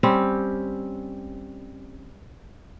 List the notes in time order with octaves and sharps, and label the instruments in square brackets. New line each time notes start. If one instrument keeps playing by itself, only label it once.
[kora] G3 C4 C#4